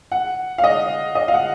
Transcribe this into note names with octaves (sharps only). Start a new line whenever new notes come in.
F#5
F5
D#5
D#5
F5
F#5